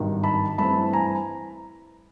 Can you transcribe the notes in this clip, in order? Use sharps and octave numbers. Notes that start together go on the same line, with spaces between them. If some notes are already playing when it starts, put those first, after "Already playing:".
Already playing: G#1 G2 D#3 F#3
A5 B5
G2 E3 A3 C4 A5 B5
G#5 A#5